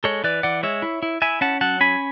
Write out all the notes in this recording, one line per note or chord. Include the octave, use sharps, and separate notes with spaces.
G#3 A4 C#5
E3 B4 D5
E3 D5 F#5
G#3 C#5 E5
E4
E4
E4 E5 G#5
C#4 F#5 A5
F#3 F#5 A5
C#4 G#5 B5